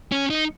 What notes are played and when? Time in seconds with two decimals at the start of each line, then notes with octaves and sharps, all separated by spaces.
0.12 C#4
0.30 D#4